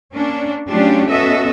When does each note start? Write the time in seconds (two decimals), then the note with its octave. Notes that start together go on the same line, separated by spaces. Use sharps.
0.13 A#3 C#4 D4
0.68 F#3 A3 C#4 D4 F4 G4
1.09 B3 C#4 F#4 A4 D#5 E5